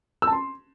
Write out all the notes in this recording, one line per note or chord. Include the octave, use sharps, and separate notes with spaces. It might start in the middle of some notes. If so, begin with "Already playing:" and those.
E6
A5
C6